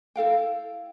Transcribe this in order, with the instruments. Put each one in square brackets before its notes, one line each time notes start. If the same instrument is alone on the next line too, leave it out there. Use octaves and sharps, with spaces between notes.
[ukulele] E4 A4 F5 G5